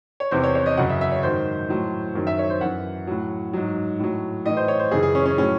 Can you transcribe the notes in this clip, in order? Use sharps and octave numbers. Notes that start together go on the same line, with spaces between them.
C#5
E2 C3 E3 C5
C#5
C#5
D#5
F#2 C#3 F#3 F#5
E5
E5
C#5
G#2 D#3 F#3 C5
A2 F#3
F#2 D#3 F#3
E5
C#5
C5
F#2 E3 F#5
A2 F#3
G#2 F#3
A2 F#3
A2 E3 D#5
C5
C#5
C5
F#2 C#3 E3 G#4
G#4
C#4
C#4
A2 F#3 C#4